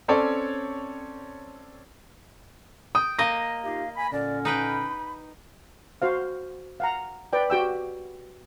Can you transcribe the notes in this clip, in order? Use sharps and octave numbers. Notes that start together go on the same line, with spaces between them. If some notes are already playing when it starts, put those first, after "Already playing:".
C4 C#4 A4 C#5 D5
G5 D#6
A#3 D#5 A#6
D#4 F4 G4 F5
G#5 B5
A#2 D3 C#4 D5
D#4 B4 G5 B5
F#4 C5 F5
F5 F#5 A#5
B4 D5 G5
F#4 G4 G5 E6